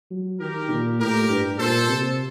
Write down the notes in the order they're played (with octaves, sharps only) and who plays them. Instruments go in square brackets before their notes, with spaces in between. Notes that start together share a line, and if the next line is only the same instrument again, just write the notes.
[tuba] F#3
[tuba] D#3 [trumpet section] G4 A#4
[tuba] A#2
[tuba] A2 [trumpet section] G4 A#4
[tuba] G2
[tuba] A#2 [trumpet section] A4 C5
[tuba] C3